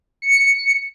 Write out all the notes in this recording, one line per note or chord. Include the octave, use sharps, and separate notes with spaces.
C#7